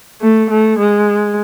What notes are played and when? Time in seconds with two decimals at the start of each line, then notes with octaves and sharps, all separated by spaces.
0.21 A3
0.50 A3
0.79 G#3